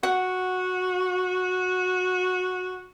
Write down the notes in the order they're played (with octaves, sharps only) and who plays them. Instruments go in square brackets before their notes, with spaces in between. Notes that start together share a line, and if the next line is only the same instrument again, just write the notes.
[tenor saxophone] F#4 [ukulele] F#5